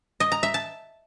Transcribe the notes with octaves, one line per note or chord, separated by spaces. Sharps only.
D#5
A#5
E5
A5